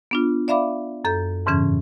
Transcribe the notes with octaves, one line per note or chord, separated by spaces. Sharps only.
B3 D4 F4
D5 E5 F5 B5 D6
F#2 A4 G6
F2 G#2 C#3 E3 C#4 G#6